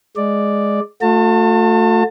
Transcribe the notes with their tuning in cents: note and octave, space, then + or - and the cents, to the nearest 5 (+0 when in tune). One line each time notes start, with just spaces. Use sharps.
G#3 +5 D5 +0
A3 +10 F#4 -45 A5 +30